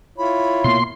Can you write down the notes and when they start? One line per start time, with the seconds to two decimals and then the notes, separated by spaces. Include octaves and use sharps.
0.18 E4 F4 C#5 B5
0.64 B2 A#3 C6